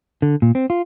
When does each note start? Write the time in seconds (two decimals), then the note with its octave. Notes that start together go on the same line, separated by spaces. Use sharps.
0.22 D3
0.42 A#2
0.55 C4
0.70 F4